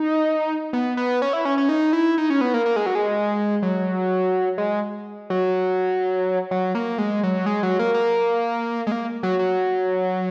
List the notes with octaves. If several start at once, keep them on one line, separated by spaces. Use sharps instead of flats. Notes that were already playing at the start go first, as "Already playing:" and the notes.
Already playing: D#4
B3
B3
C#4
E4
C#4
C#4
D#4
E4
D#4
C#4
B3
A#3
A#3
G#3
F#3
G#3
F#3
G#3
F#3
F#3
A#3
G#3
F#3
G#3
F#3
A#3
A#3
G#3
A#3
F#3
F#3